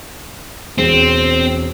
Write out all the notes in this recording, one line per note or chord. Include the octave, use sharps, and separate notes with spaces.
E1 C4 G#4